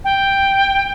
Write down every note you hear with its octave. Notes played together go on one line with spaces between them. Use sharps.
G5